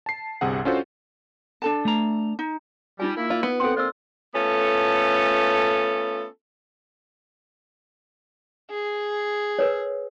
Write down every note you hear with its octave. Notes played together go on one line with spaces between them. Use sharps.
A5 C7
G1 C2 C3 G#4 F#5
C#4 D4 F4 F#4 A4 C5
D4 A4 A5
A3 A#5
D#4
G3 D#4 F4 G#5
A#3 E4
F4 D5
B3
C4 A4 F#5 C6
A#3 C4 F4 C5 D5 E6
A3 B3 C#4 F4 A4
G#4
A#4 B4 C#5